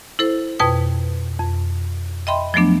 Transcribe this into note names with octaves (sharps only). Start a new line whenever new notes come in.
E4 A4 C5
F2 B2 B4 G5 D#6
F2
D#5 E5 G5 B5 C6
F3 F#3 A3 B3 D4